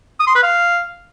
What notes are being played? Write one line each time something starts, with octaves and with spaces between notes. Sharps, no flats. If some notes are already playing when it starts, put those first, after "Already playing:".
D#6
C6
B4
F5